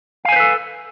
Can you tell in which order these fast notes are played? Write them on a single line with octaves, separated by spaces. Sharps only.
F5 G#5 C5 B4 A4